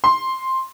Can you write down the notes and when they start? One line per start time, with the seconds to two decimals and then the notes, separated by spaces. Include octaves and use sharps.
0.04 C6